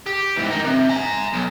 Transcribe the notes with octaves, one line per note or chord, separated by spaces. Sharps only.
G4
G#2 E3
D#3 D#4
C3
G#5 A#5
B1